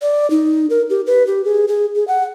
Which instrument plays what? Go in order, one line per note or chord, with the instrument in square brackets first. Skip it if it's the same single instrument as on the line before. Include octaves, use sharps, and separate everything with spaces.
[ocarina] D5
D#4
A#4
G4
B4
G4
G#4
G#4
G#4
F#5